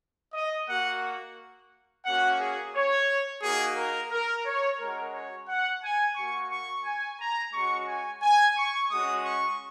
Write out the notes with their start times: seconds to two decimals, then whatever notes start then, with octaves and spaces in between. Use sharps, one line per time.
0.34 D#5
0.68 A#3 F#4 F#5
2.05 A#3 C#4 F#4 F#5
2.39 G#4
2.74 C#5
3.43 A#3 D#4 F#4 G#4
3.77 A#4
4.11 A#4
4.46 C#5
4.79 G#3 C#4 F#4 A#4
5.13 C#5
5.49 F#5
5.83 G#5
6.16 A#3 F#4 C#6
6.51 C#6
6.85 G#5
7.20 A#5
7.54 G#3 C#4 F#4 C#6
7.88 G#5
8.22 G#5
8.57 C#6
8.91 G#3 C#4 F#4 D#6
9.25 C#6